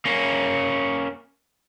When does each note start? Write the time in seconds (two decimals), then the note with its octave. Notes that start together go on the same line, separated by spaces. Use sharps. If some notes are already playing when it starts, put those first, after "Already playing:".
0.05 A#3 C#4